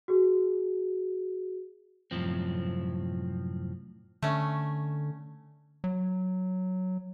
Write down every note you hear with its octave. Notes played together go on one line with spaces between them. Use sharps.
F#4 G#4
C2 F#2 A2 F3 C4
D3 A3 C#4
F#3